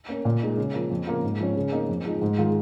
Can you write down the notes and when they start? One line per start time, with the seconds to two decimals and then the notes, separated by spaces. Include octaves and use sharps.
0.09 A#3 C#4 A#4
0.25 A#2
0.42 G#3 D#4 A#4
0.58 C#3
0.74 F3 A#3
0.91 F2
1.07 C#3 A#3 F4
1.23 G#2
1.40 F3 C#4
1.56 C#3
1.72 A#3 D#4 G#4
1.89 F2
2.06 F3 G#3 D#4
2.22 G#2
2.38 D#3 G#3 F4